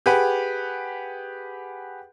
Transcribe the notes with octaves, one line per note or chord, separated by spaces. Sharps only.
G4 G#4 B4 F#5